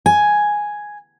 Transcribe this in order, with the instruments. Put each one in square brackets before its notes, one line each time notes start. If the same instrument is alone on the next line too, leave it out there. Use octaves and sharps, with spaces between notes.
[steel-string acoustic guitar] G#5